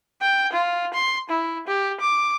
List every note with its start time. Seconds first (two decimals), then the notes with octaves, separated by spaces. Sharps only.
0.21 G5
0.53 F4
0.93 C6
1.29 E4
1.67 G4
2.00 D6